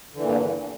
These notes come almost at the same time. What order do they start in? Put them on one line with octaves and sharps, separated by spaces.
D3 E3 A#2 G2 E2